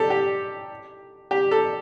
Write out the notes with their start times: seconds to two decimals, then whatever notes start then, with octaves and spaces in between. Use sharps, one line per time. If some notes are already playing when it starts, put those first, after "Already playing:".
Already playing: G4 A4
0.10 G4
1.31 G4
1.51 A4